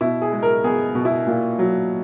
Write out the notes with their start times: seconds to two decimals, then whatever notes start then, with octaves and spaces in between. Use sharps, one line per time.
0.01 B2 E4
0.22 G#4
0.32 G#3
0.43 A#4
0.64 B3 G#4
0.95 B2
1.05 E4
1.27 A#2
1.59 F#3